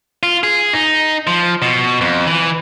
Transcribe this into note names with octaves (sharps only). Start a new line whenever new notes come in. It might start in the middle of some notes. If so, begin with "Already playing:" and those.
F4
G#4
D#4
F3
B2
F2
E3